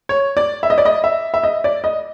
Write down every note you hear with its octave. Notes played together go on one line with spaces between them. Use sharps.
C#5
D5
E5
D#5
D5
D#5
E5
E5
D#5
D5
D#5